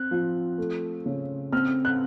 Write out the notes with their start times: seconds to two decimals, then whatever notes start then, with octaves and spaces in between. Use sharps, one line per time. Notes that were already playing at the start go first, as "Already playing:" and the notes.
Already playing: C4 F#6
0.11 F3
0.58 A3
1.06 C#3
1.53 C4 F6
1.85 F#6